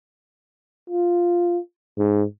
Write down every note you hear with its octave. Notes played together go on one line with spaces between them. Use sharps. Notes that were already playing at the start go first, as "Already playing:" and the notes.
F4
G#2